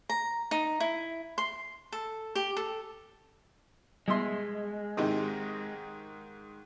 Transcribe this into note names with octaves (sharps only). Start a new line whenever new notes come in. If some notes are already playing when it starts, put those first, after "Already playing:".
A#5
D#4
E4
C6
A4
G4
A4
B2 G3 G#3 E5 C6
G#2 C3 D#3 D#4